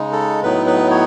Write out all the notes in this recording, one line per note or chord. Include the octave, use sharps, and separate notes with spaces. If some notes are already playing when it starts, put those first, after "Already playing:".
Already playing: C#3 G#3 D#4
A4
A2 F#3 B3 D#4 B4
B4
C#5